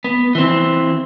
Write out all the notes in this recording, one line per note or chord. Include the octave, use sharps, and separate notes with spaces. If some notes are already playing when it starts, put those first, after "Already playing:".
B3
E3 C4